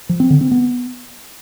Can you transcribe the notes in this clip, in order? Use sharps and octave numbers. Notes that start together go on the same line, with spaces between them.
F3
C4
D3
C4
B3